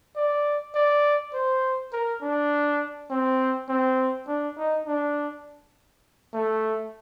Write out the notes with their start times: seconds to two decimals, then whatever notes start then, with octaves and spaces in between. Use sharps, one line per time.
0.16 D5
0.75 D5
1.34 C5
1.93 A#4
2.22 D4
3.11 C4
3.69 C4
4.28 D4
4.58 D#4
4.86 D4
6.34 A3